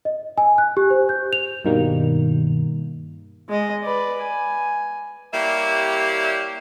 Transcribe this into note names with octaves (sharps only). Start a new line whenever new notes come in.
D#5
G#5
F#6
G4
C5
G6
F7
G2 B2 D#3 G3 A#3
G#3 D#5
B4 D5
G#5
G3 A#3 E4 G4 C#5 E5